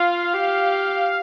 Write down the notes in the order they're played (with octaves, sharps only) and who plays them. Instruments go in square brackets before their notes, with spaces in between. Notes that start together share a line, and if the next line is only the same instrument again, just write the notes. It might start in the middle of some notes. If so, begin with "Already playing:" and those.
Already playing: [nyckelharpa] F4 [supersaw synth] F5
[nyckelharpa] G4